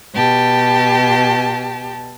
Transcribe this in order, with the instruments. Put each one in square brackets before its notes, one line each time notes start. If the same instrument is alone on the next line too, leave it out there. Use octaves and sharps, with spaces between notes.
[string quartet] B2 G4 A5